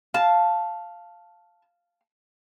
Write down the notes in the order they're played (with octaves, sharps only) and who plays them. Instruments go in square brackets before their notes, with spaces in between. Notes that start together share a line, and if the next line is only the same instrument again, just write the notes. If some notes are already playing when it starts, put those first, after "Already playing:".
[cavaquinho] F5 [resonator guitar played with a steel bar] A5